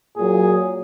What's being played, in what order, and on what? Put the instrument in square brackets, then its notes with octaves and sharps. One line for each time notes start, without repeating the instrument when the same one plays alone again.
[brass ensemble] A#2 F#3 G#4